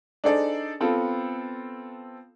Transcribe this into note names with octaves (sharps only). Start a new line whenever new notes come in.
D4 D#4 G#4 A4 C5 D5
B3 C4 F4 A4